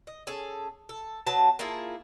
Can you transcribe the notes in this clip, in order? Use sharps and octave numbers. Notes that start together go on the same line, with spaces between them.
D#5
C#4 G#4 A4
A4
F#3 B3 A5
A#3 E4 F4 G#4